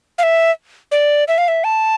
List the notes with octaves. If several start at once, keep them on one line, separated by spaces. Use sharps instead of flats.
F5
E5
D5
E5
F5
E5
A5